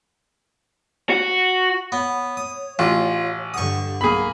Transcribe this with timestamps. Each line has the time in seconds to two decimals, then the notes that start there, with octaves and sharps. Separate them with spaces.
1.10 F#4
1.92 B3 C#5
2.37 D#6
2.79 A1 F4 F#4
3.54 G2 D3 F#5 C#6 D#6
4.01 B1 A#3 G#4 B5